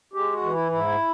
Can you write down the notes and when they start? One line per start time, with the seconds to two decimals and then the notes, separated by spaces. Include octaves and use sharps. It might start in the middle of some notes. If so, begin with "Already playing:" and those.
0.14 G#3 G4
0.33 F#4
0.43 E3
0.53 E4
0.72 G#2 E4